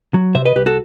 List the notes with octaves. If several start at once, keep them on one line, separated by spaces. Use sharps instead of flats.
F#3
C3 C5 E5
B4 D#5
C2 G4 B4
F#4 A4